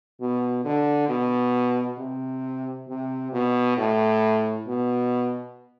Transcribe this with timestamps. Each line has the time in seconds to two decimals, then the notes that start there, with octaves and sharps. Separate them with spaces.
0.20 B2
0.64 D3
1.08 B2
1.98 C3
2.88 C3
3.32 B2
3.77 A2
4.66 B2